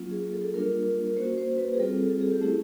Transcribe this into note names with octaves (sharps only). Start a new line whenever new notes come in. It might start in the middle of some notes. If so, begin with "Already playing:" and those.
Already playing: F#3 A#3 C#4 F4
G#4
A4
G3 A#3 D4 F4 A#4
A#3 C#4 F#4 C5
C5
B4
G#4
G3 C4 F4 A4
A4
G#4
G4
A3 C#4 E4 G#4